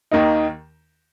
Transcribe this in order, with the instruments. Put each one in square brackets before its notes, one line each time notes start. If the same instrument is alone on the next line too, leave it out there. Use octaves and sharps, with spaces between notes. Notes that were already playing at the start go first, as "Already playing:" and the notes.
[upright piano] D#2 D#3 A#3 D#4